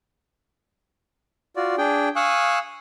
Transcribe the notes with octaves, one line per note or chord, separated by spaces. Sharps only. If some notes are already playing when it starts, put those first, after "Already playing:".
F4 F#4 D5
D4 G#4 G5
F5 G#5 C#6 D#6 E6 F#6